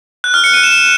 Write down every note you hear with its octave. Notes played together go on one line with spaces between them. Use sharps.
F#6
F6
C#7
D#7
E7